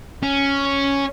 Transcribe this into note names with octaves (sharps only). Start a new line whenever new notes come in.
C#4